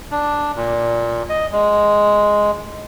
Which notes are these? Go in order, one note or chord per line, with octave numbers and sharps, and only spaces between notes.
D4
A#2
D#5
G#3